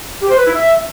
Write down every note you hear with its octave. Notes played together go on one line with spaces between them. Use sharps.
G4
C5
B4
E4
E5